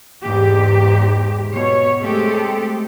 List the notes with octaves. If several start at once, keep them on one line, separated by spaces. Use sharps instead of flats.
E2 G#2 G4
B2 C#5
G#3 A3 C4 G4 A4